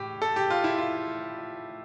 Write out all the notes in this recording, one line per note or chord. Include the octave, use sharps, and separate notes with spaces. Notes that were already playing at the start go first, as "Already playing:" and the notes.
Already playing: A2 G4
A4
G4
F4
E4
F4